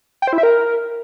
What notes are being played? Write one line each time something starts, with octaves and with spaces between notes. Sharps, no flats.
G5
C5
E4
E5
A#4